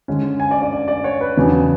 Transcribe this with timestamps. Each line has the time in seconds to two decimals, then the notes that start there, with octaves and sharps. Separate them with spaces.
0.08 D3 G#3 C#4
0.40 G#5
0.51 D5
0.62 D5
0.72 D5
0.88 D5
1.04 C#5
1.21 B4
1.37 E2 C#3 F#3 B3 D4